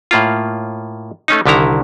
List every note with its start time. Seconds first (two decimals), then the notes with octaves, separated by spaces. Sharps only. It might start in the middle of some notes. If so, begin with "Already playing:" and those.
0.11 A2 A#3 F4
1.28 A3 C#4 D#4
1.46 C2 D3 D#3 E4 A#5